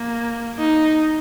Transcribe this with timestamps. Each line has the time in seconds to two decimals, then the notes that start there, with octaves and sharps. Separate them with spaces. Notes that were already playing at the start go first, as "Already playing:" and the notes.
Already playing: A#3
0.59 D#4